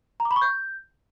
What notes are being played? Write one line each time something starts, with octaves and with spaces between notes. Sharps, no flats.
A#5
D6
B5
C#6
G6